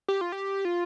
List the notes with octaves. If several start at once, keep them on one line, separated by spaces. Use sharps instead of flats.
G4
F4
G4
F4